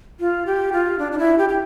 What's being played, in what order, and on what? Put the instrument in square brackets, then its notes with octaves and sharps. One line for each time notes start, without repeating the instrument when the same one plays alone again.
[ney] F4
G4
F4
D4
D4
E4
G4
G4